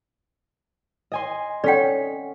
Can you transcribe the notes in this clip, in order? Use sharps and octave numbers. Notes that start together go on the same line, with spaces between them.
D#5 G#5 C6
C#4 A4 D5 F#5 G5 B6